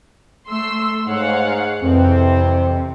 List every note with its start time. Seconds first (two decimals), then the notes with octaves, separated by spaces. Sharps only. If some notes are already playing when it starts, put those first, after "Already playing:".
0.48 A3 C6 E6
1.07 G#2 C#5 F5 F#5
1.82 F2 C3 E3 C4